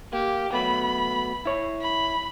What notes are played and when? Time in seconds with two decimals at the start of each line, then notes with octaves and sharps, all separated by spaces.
0.13 A#3 G4
0.53 F#3 A3 B3 B5
1.45 E4 C#5
1.81 B5